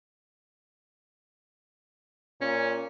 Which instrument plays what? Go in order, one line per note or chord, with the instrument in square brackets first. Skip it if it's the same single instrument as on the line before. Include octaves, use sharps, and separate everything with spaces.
[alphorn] A#2 [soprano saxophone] C#4